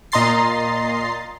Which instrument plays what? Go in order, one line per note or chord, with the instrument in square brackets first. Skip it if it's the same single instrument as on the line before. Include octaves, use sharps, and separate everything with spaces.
[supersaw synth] A#2 D#5 A#5 C6 A6 C7